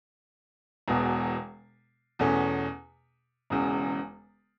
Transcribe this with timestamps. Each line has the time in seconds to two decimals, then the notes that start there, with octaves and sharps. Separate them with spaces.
0.88 E1 E2 B2
2.19 E2 B2 A3 C#4
3.50 E1 E2 C#3